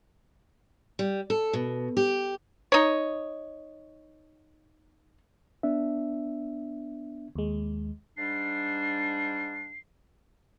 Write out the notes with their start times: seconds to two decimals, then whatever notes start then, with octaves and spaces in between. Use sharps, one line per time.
0.99 G3
1.30 A4
1.53 B2
1.97 G4
2.72 D#4 C#5
5.63 B3 D4 E5
7.35 D#2 G#3
8.17 G#2 G3 D4 C7